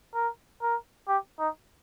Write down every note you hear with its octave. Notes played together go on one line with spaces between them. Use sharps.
A#4
A#4
G4
D#4